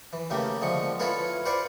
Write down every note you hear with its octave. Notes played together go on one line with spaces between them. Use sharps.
E3
C#3 A3 A#3 G4
D3 F3 G#3 C#6
E4 F4 A4 B4 C#5 F5
B4 C5 D5 F5 F#5 G#5